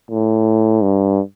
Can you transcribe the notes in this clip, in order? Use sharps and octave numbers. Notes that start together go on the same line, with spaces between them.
A2
G2